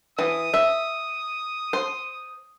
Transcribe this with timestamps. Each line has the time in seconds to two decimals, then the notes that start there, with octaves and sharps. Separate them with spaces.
0.19 E3 D#6
0.54 E5
1.73 C5